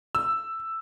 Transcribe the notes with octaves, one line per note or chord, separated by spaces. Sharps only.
E6